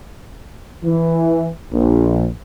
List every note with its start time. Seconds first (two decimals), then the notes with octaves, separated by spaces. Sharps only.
0.84 E3
1.72 A#1